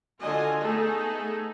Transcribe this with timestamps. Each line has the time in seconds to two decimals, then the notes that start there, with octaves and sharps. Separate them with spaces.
0.20 D3 F4 F#4 D#5 G#5
0.60 A3 B3 D#4 G#4 A4